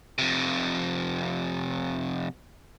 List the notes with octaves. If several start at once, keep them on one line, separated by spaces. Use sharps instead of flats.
F2 C3